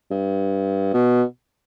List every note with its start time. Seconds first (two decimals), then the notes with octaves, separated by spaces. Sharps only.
0.11 G2
0.93 B2